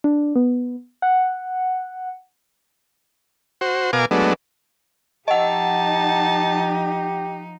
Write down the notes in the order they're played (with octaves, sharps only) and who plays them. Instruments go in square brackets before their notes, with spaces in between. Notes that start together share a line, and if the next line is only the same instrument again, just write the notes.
[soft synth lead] D4
B3
F#5
[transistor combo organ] F#4 C5
B2 A#4 F5 G#5 D6
F#3 G#3 A3 B3 D4
[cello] F3 D#4 [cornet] G4 [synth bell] D#5 F#5 [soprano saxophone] A5